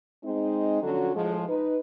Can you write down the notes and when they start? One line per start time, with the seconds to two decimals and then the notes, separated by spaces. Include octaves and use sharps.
0.24 G#3 C4 D#4
0.83 D3 F3 F#3 C#4 F#4 A4
1.15 A2 F3 G#3
1.48 D#4 B4